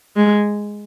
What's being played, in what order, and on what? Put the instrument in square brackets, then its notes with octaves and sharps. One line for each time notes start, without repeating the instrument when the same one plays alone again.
[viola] G#3